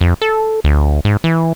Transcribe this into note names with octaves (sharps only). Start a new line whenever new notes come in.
F2
A4
D2
G#2
E3